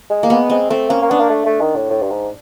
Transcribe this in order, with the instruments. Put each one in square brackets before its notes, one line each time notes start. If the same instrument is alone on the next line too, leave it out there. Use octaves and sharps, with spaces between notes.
[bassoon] G#3
[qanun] A#3
[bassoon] G#3 [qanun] B3
[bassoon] G#3 [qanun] C4
[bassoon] A3 [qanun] C4
[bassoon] A#3 [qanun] C#4
[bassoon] A#3
[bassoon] B3 [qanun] D4
[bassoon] A#3
A3
A3
D#3
A2
A2
G2
G#2